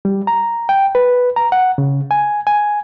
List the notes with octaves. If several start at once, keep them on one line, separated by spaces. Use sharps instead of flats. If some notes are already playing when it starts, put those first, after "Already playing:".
G3
A#5
G5
B4
A#5
F#5
C#3
G#5
G#5